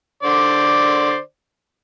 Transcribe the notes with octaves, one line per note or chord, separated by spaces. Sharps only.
D3 C5 D5